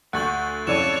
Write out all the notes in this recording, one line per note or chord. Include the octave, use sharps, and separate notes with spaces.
D2 F#5 C#6 F#6 G6 A6 F#7
F2 C#3 E4 A4 C#5 D5 D#7 E7